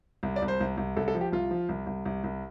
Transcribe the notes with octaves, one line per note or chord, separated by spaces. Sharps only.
C2
D5
C2
C5
C2
C2
C2 A4
A4
F3
G4
C2 F4
F3
C2
C2
C2
C2